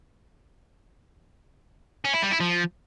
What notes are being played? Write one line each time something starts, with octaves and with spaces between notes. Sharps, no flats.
C#4
E4
G3
E4
F3